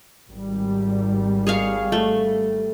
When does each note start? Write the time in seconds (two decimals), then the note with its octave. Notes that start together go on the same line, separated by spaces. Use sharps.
0.30 G#1 G3
1.47 G#4 C#5 F5
1.92 A3